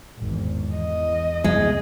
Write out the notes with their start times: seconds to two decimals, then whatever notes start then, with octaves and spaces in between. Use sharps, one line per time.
0.23 G#1 E2
0.75 E2 D#5
1.44 C2 G3 G#3 B3